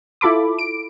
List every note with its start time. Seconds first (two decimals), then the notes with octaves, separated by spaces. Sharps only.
0.21 E4 F4 A4 B5 D6
0.59 D7